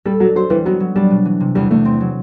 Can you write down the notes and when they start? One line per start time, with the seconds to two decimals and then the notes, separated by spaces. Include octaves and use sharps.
0.06 G3 A4
0.20 F#3 D4
0.35 F#3 C5
0.50 E3 G3
0.65 F#3 B3
0.80 F#3
0.96 G3 D4
1.10 B2
1.25 E3
1.40 C3
1.55 E2 G3
1.70 E2 A3
1.85 C4
2.01 F#3